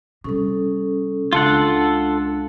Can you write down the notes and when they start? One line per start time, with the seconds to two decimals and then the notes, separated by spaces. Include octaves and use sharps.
0.24 C3 G3 C#4 A4
1.33 C#2 D4 F4 A4 F#5